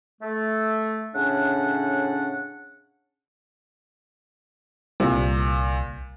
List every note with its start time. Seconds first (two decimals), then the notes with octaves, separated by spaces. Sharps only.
0.22 A3
1.15 A2 C#3 C#4 D4 F#5
5.00 C2 A#2